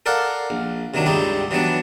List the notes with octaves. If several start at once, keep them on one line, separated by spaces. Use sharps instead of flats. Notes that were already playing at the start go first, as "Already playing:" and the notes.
A4 A#4 D5 F5 F#5
A#1
C3 D#3 F#3 D4
C#2 G2 G3 D#4 E4 G4
E3 F#3 G3 B3 D4